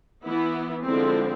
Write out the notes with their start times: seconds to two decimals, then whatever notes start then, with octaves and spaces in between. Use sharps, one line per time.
0.23 E3 B3 E4
0.83 D3 F3 G#3 C4 E4